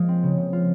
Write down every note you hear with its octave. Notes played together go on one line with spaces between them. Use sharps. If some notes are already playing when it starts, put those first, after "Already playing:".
Already playing: F3 G#3 A#3 F4
C4
C#3
F3
F4